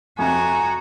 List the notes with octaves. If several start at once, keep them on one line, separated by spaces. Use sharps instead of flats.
F2 C3 F#4 G#5 A#5